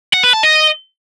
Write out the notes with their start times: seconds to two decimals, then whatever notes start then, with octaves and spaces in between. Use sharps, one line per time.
0.14 F#5
0.24 B4
0.33 A5
0.43 D#5